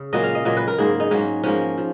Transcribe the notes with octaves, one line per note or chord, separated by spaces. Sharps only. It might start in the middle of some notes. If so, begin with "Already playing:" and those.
Already playing: C#3
A#2 F#3 A#3 D#5
F5
D#5
A#2 F#3 A#3 D#5
B4
A#4
G#2 F#3 A#3 G#4
D#4
G#2 F#3 A#3 C#4
G#2 F3 A#3 C#4
F3